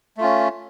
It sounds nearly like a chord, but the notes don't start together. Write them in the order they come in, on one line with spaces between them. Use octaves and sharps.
A3 F4 C#4